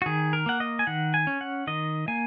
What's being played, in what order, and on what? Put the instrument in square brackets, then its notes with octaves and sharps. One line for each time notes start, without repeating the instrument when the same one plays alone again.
[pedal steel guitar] F#4
D#3 G#4
A#4
A#3 F#5
D#5
G#5
D#3 F#5
G#5
C#4
F#5
D#3 D#5
A#3 G#5